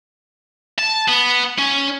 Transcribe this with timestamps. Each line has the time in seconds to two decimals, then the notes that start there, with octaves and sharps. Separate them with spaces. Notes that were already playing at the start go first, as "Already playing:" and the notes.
0.79 A5
1.08 B3
1.58 C#4